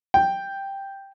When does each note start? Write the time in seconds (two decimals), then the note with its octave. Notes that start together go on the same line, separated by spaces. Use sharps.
0.14 G5